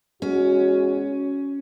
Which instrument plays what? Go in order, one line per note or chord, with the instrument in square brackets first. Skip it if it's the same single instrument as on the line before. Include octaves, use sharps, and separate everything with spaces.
[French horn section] E2 G#3 F#4 [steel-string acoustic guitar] C#4